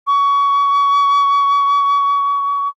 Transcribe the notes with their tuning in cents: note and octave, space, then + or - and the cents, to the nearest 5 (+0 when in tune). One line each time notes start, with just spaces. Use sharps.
C#6 +30